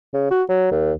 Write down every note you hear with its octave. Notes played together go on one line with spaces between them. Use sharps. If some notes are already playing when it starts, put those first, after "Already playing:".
C#3
F#4
F#3
D#2